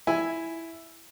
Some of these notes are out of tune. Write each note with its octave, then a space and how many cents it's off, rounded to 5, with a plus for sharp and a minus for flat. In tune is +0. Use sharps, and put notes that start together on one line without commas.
E4 +0 G#5 +0